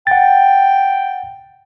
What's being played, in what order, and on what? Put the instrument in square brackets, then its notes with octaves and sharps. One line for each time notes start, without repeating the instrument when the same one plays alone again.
[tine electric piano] F#5 A6 [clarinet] G5